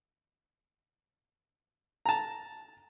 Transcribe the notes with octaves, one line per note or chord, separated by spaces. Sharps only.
A5 A#5